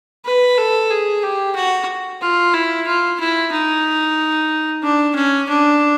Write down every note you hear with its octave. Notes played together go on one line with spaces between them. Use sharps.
B4
A4
G#4
G4
F#4
F4
E4
F4
E4
D#4
D4
C#4
D4